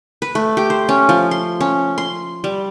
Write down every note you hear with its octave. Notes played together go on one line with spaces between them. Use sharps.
B4
A3
G4
C5
C#4
F3
C6
C#4
C6
G3